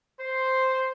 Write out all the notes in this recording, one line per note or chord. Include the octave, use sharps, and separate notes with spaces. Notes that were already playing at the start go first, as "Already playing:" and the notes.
C5 C6